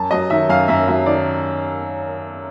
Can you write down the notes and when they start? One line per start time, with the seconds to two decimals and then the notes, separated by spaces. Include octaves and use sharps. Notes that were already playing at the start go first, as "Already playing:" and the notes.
Already playing: F#2 A5
0.11 F#3 D#5
0.30 D#3 E5
0.49 F#2 F5
0.68 F#2 E5
0.88 F#3 E5
1.06 D#3 D5